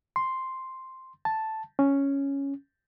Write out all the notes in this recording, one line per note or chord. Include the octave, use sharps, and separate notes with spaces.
C6
A5
C#4